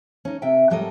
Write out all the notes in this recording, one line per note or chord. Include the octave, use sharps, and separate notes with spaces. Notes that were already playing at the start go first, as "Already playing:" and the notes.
C#4 D#4
C3 E5 G5
G#2 F#3 G3 A4 A#4 D#5